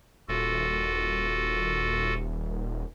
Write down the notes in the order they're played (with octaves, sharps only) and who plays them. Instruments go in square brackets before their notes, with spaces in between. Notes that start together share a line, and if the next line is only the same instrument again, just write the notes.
[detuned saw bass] D#1 [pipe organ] F4 F#4 A4